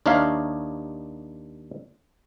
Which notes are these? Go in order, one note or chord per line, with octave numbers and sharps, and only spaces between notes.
D#2 D4 D#4 C#5 E5 F5